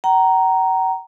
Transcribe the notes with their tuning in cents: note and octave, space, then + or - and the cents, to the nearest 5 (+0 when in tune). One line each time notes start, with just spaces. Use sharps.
F#5 +45 A#5 +0